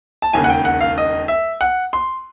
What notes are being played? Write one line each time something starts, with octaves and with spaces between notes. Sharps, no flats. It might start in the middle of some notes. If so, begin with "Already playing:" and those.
A5
E1 D#2 C#3 G#5
F#5
G5
F#5
F5
D#5
E5
F#5
C6